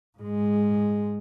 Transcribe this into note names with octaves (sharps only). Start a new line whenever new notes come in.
G#2 G#3